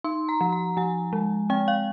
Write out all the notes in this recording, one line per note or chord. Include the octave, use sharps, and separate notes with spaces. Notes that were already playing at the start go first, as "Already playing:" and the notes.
D#4 C6
A#5
F3
A#5
F3 G#5
G#3
C4 G5
F5